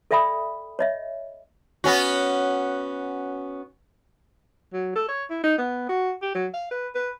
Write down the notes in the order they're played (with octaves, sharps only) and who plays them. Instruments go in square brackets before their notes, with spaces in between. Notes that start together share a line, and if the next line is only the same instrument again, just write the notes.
[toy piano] A4 D5 E5 G5 B5 D#6
C#5 D#5 E5
[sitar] B3 C#4 F#4
[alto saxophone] F#3
A4
C#5
E4
D#4
B3
F#4
G4
F#3
F5
B4
B4